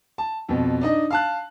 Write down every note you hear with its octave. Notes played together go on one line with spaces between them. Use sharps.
A5
F2 B2
D4 D#4 D#5
F5 A5 F#6